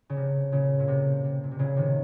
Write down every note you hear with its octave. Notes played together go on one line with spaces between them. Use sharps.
C#3
C3
A#2 C#3
A#2
C3
C3
A#2
C3
A#2 C#3
C3 D#3